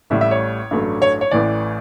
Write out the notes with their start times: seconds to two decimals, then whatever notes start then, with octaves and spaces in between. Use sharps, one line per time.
0.10 A1 A2 G3 E5
0.21 E5
0.31 C#5
0.71 A1 G2 F#3 A3
1.02 C#5
1.21 C#5
1.31 A1 A2 E3 D5